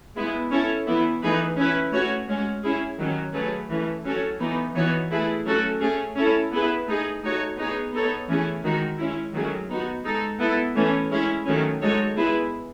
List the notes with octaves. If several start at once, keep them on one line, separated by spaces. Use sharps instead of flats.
G#3 B3 E4
C#4 E4 A4 C#5
E3 B3 E4
E3 A3 D#4 G#4 B4
C#4 E4 B4
A3 C#4 F#4 C#5
G#3 C#4 F#4
C#4 E4 G#4
D#3 F#3 C#4
F#3 A3 C#4 G#4 B4
E3 A3 C#4
F#3 C#4 F#4 A4 C#5
E3 B3 D#4
E3 B3 D#4 F#4 C#5
A3 E4 G#4 B4
F#3 A3 C#4 F#4 A4
A3 C#4 G#4
C#4 E4 A4
B3 E4 G#4 B4
A3 D#4 G#4
A3 D#4 F#4 C#5
B3 D#4 G#4 C#5
B3 D#4 A4 C#5
E3 A3 C#4 E4 G#4
D#3 G#3 D#4 F#4
G#3 C#4 E4
D#3 F#3 A3 C#4 G#4
B3 D#4 F#4
G#3 D#4 A4
B3 E4 A4
E3 A3 C#4
G#3 C#4 E4 G#4
D#3 F#3 A3 C#4
G#3 D#4 F#4 A4 C#5
G#3 B3 E4 G#4 B4